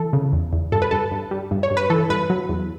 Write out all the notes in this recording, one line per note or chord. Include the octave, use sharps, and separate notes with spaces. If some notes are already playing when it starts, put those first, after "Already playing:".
Already playing: E3 A4
C#3
E2
E2
G2 A4
B4
G2 A4
G2
G3
G2
C#5
G2
B4
E3 A4
G2 B4
F#3
E2